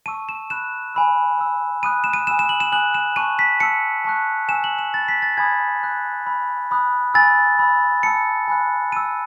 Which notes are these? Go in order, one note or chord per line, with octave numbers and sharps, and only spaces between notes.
A5 C#6 E6 D#7
E7
B5 F#6 E7
G#5 B5 E6
B5 E6
B5 D#6 F#6 D#7
E7
D#7
G#5 B5 E6 E7
E7
F#7
E7
G#5 D#6 F#6 F#7
E7
A5 C#6 F#6 D#7
B6
A5 E6 C#7
A5 C#6 F#6
G#5 C#6 E6 E7
F#7
E7
B5 E6 A6
B6
A6
G#5 B5 D#6 G#6
A5 D#6 F#6
B5 E6
B5 D#6 F#6
G#5 B5 E6 A6
B5 E6
A5 E6 C#7
G#5 B5 F#6
A5 E6 D#7